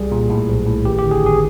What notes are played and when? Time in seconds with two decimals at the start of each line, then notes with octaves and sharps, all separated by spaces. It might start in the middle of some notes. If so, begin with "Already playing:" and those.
Already playing: C2 G3 G#4
0.12 A#2
0.30 A2
0.49 B1
0.66 A2
0.85 G#1 G4
0.99 D3 G4
1.11 G#4
1.22 G#1 G#4